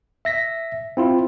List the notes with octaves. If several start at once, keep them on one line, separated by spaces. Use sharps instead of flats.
E5 A#6 B6
C4 E4 F4